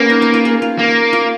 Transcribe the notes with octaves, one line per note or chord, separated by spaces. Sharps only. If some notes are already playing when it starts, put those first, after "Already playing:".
Already playing: G#3 A#3 B3 C#4
D#4
D#4
F4
G#4
F4
A#3
F4